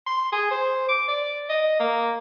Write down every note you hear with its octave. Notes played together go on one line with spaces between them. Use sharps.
C6
G#4
C5
D6
D5
D#5
A#3